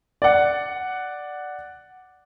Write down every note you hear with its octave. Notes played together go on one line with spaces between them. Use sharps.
D5 F#5